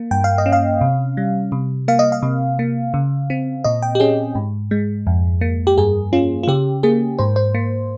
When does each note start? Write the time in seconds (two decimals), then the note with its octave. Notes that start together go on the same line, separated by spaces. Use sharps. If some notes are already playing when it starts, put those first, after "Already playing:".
Already playing: A#3
0.11 G2 G5
0.24 F5
0.38 D#5
0.46 C#4
0.52 F5
0.81 C3
1.17 G3
1.52 C3
1.88 A#3 F5
1.99 D#5
2.12 F5
2.23 C3
2.59 A#3
2.94 C#3
3.30 C4
3.64 A#2 D#5
3.82 G5
3.95 G4
4.00 C#4 G#4
4.35 G#2
4.71 G#3
5.07 F2
5.41 A#3
5.67 G4
5.78 G2 G#4
6.13 C#4 F4
6.43 F4
6.48 C#3 G4
6.83 A#3 G#4
7.19 G#2 C5
7.36 C5
7.55 A#3